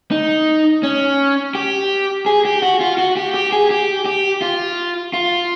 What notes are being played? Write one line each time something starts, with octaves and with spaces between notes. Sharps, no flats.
D#4
C#4
G4
G#4
G4
F#4
F4
F#4
G4
G4
G#4
G4
G4
F4
F4